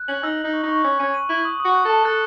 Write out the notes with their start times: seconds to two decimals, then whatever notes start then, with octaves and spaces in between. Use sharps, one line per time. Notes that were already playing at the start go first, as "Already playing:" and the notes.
Already playing: F#6
0.08 C#4 F#7
0.23 D#4 E6
0.38 F#7
0.44 D#4
0.53 C#6
0.63 D#4
0.69 C#6
0.84 C#4 E6
1.00 C#4 D#7
1.14 D#7
1.29 E4 F#7
1.45 D#6
1.60 D#6
1.65 F#4
1.75 F#6
1.85 A4 A5
2.05 A4 F#6